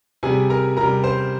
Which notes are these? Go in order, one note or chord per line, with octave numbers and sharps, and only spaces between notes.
C3 G3 G#4 G#5
A#4 A#5
C3 G3 A#4 A#5
C5 C6